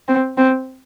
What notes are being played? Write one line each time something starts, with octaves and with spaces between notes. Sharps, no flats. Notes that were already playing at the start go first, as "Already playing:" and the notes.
C4
C4